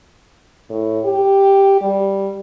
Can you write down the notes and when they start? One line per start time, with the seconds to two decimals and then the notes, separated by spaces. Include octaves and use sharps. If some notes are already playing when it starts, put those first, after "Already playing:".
0.70 A2
1.05 G4
1.82 G3